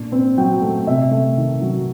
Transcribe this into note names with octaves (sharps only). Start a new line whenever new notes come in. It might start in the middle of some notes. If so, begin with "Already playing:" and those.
Already playing: A#2 D4
C4
F#3 G5
A3
C3 E5
A3
D#3
F#3